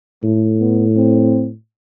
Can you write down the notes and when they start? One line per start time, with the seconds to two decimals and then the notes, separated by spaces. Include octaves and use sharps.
0.23 A2 A3
0.60 B3
0.97 C4